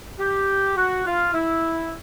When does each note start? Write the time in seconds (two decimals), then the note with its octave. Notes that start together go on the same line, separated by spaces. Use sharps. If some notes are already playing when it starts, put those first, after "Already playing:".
0.19 G4
0.76 F#4
1.05 F4
1.34 E4